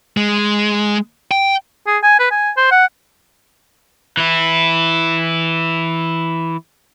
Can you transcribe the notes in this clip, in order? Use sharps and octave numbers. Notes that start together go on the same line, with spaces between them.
G#3
G5
G#4
G#5
B4
G#5
C5
F#5
E3 E4